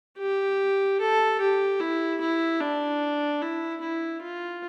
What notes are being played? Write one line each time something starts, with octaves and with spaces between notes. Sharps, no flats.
G4
A4
G4
E4
E4
D4
E4
E4
F4